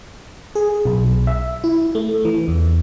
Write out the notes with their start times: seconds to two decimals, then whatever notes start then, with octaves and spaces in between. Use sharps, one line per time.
0.55 G#4
0.85 B1
1.27 E5
1.64 E4
1.95 A3
2.25 E3
2.48 E2